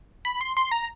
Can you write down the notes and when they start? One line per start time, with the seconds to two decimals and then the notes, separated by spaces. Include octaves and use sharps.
0.25 B5
0.41 C6
0.57 C6
0.71 A#5